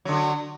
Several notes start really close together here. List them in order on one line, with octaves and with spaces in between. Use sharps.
F#3 D3 F#4